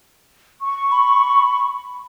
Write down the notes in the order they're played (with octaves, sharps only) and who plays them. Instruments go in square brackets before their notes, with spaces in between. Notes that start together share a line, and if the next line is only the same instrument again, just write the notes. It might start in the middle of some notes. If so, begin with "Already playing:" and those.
[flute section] C#6
[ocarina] B5